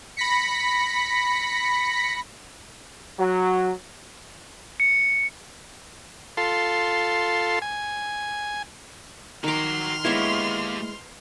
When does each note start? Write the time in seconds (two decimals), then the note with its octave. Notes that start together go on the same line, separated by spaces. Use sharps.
0.17 B5 A#6 B6 C#7
3.18 F#3
4.80 C#7
6.37 F4 A4 C6
7.62 G#5
9.44 D#3 F#4 A#5 C6 D6 F6
10.05 G#3 A#3 B3 E4 G4 C#5 E5